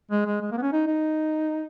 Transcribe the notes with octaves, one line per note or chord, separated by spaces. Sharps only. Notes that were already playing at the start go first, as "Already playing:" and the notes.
G#3
G#3
G#3
A#3
B3
C#4
D#4
D#4